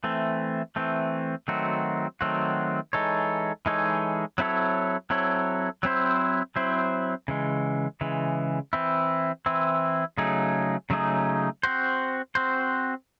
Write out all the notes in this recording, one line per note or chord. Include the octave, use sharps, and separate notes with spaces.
E3 A3 C4
E3 A3 C4
D#3 F#3 A3 C4 F#4
D#3 F#3 A3 C4 F#4
E3 G#3 D#4 A4 C#5
E3 G#3 D#4 A4 C#5
F#3 C4 E4 A4 C#5
F#3 C4 E4 A4 C#5
F#3 C4 E4 C5
F#3 C4 E4 C5
C#3 E3 G#3
C#3 E3 G#3
E3 C4 E4
E3 C4 E4
C#3 F#3 A3 D#4 G#4
C#3 F#3 A3 D#4 G#4
C4 F#4 C5
C4 F#4 C5